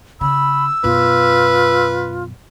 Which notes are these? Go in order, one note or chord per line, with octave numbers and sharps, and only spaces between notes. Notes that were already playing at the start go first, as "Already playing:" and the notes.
C#3 B5 E6
F#2 B2 F4 B4